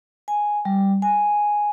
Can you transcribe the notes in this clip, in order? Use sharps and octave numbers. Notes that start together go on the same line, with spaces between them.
G#5
G3
G#5